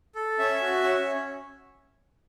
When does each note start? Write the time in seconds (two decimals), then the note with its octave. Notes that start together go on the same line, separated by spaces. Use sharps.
0.15 A4
0.39 C#4 E5
0.61 F#4
0.83 C#4